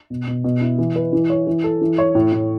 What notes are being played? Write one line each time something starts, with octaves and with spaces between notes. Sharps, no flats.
B2
B2
B2
E4
E3
B4
E3
C#5
E3
A4
E3
C#5
A2
A2